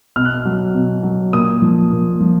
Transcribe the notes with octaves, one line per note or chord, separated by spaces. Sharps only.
B2 F6
F#6
F6
F#3
B2
F#3
A#2 D#6
F3
A#2
F3